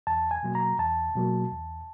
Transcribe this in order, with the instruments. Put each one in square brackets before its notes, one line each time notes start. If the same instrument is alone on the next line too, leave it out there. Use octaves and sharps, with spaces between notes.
[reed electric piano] E2 A5
G#5
B2 F#3 A#3
A#5
E2 A5
B2 F#3 A#3
E2